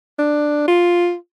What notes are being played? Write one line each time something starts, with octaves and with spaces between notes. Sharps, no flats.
D4
F4